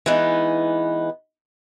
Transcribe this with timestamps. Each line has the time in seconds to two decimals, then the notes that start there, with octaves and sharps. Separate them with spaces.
0.06 E3 G#3 B3 D#4